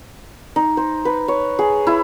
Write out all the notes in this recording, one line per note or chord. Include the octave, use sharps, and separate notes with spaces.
D#4
C5
B4
C#5
G#4
E4